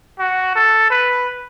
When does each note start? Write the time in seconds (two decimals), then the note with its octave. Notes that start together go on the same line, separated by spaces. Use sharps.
0.19 F#4
0.55 A4
0.90 B4